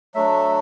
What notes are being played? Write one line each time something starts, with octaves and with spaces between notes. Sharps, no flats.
F#3 A3 D4 E5